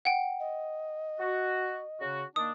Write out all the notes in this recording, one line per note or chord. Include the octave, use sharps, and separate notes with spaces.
F#5 G5
D#5
F#4
C#3 F#4
D#3 A#3 D4 D#6